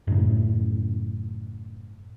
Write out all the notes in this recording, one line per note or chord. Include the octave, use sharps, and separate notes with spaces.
F#2 A2 C#3